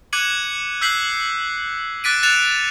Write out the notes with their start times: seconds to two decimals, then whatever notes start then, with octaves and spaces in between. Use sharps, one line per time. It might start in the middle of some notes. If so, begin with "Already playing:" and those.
0.13 D6 F#6 G#6 C#7 D#7 F#7
0.81 E6 F#6 G6 B6 C7 F#7
2.04 D6 F#6 A6 B6 D7 D#7
2.23 F#6 A6 C#7 E7 F7